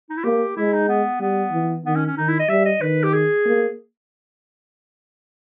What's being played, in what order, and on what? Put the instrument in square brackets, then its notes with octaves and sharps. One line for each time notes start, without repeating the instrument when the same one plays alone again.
[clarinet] D#4
E4
[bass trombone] A#3 [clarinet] G4
[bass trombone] G#3 [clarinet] E4
[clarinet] D#4
B3
[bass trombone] G3 [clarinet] B3
[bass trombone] E3
[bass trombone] D#3 [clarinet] B3
[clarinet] C#4
C#4
[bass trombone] D#3 [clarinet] D#4
[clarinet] E4
D#5
[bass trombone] G3 [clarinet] E5
[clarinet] D#5
[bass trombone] D#3 [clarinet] B4
[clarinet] G4
G#4
[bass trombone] A#3